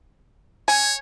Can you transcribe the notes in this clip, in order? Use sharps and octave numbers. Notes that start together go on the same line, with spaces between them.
C#5 G#5